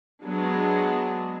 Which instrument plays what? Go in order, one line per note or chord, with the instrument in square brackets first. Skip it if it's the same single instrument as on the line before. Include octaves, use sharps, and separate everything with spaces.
[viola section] F#3 G#3 B3 D4 G#4